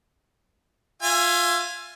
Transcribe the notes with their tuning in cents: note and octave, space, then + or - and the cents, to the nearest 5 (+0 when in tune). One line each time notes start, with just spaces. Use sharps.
F4 +10 E5 +25 G#5 +0